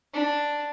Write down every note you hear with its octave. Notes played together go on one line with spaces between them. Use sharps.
D4